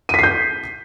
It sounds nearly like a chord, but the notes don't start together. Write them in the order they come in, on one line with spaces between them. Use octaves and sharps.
D#7 B6 C7 G6